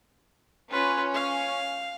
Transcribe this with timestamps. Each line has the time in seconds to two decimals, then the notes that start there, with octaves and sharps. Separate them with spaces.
0.71 C#4 F4 B4
1.14 F5